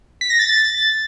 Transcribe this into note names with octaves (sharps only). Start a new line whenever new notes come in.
B6
A#6
A6